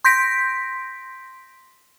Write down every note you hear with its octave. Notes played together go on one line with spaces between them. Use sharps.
C6 G6 A#6 B6 D7